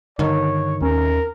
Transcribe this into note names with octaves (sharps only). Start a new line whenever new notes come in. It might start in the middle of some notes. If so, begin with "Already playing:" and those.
G2 D3 D#3 C#5
D#2 C#4 A#4